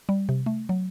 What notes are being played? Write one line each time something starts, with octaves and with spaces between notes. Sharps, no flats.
G3
C3
A3
F#3